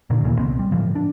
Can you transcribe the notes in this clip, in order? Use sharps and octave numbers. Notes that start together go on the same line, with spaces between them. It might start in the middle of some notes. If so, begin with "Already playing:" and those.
A#2 D3 D#3
D1 D#2 A#2 E3
C2 B3 C4
G3
A2 D3 E3 F3
D4